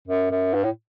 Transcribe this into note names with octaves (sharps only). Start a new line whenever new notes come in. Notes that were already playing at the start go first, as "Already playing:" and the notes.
F#2
F#2
G2
A2